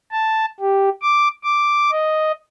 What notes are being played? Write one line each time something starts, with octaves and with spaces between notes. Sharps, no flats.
A5
G4
D6
D6
D#5